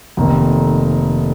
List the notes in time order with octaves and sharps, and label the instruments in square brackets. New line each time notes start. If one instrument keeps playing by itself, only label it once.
[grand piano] F1 F2 D#3 A#3